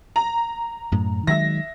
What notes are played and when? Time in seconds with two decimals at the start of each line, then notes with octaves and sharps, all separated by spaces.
0.16 A#5
0.92 F#2 A2
1.27 D#3 F#3 G#3 E5 A#6